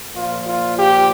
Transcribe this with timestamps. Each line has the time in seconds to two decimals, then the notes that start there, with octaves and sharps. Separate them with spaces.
0.14 A#2 F3 F4
0.44 F4
0.76 G4